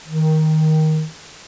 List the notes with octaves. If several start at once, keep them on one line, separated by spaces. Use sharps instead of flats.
D#3